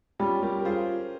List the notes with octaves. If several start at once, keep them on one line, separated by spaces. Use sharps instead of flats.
G3 C#4 F4
G3 G4 A#4
A#4
F4 G#4 C5